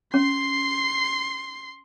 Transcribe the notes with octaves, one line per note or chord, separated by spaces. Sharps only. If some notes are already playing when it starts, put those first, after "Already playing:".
C#4 C6 C7